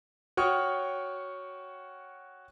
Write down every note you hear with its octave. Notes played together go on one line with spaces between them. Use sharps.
F#4 C#5 G5 C#6 D#6 F6